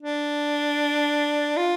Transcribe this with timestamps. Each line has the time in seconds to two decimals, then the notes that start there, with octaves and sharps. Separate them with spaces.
0.03 D4
1.57 F4